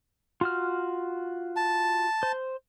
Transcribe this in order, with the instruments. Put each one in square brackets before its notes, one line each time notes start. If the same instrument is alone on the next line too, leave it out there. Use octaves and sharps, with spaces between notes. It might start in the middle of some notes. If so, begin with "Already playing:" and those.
[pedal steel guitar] F4 F#4 F6
[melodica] A5
[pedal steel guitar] C5